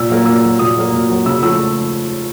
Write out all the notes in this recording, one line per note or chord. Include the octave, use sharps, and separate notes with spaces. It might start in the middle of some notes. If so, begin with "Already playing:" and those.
Already playing: A#2 E6
F#3 A#3
A#2 E6
F#3 A#3
A#2 D#6
F#3 A#3
A#2
F#3 A#3
C#3 E6
F3 A3 E6